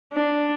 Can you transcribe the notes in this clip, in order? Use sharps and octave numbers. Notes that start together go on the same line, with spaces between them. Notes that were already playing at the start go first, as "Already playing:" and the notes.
D4